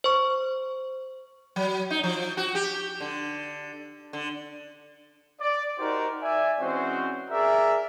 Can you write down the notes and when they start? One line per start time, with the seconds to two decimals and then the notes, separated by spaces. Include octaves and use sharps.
0.04 C5 C#6
1.56 F#3
1.90 D#4
2.03 F3
2.37 F#4
2.55 G4
3.00 D3
4.13 D3
5.41 D5
5.79 D#4 F#4 G4 A#4 C5 D5
6.22 D5 E5 G#5
6.61 E3 G#3 C4 C#4 F#4 C5
7.31 G#4 A#4 D5 E5